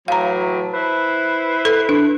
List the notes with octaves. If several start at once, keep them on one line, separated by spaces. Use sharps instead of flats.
A2 E3 F#3 F5 A#5
E4 B4 C5
A4
D4